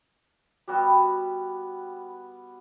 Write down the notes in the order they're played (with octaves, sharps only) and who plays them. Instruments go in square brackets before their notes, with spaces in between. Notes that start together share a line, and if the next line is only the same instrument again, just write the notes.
[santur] G3 B3 F#4 G4